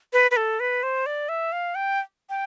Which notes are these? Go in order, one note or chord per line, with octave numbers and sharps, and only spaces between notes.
B4
B4
A4
B4
C5
D5
E5
F5
G5
G5